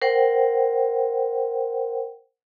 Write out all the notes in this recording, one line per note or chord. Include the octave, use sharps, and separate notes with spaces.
A#4 C5 F#5 G5